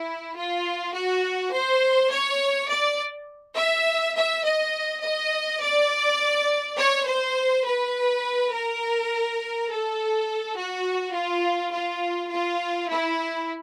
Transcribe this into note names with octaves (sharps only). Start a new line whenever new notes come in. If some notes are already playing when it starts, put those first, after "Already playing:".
Already playing: E4
F4
F#4
C5
C#5
D5
E5
E5
D#5
D#5
D5
C#5
C5
B4
A#4
A4
F#4
F4
F4
F4
E4